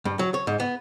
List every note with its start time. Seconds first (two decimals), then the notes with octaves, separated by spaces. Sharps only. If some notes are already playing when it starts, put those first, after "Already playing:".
0.05 G2
0.19 F#3
0.34 C#5
0.47 G#2
0.60 B3